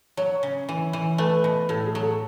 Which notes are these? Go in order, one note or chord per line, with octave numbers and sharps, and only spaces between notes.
F#3 C#5
C#3
E3
E3
A3 B4
B2
A2 A4
G#4
F#3
A4